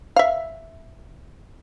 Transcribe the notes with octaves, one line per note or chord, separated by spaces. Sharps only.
E5 F5